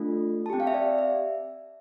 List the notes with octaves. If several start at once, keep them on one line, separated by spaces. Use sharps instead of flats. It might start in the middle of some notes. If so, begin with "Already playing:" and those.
Already playing: A3 D4 F4 A4
A5
C4 G4 G5
F5
E5
D5
E5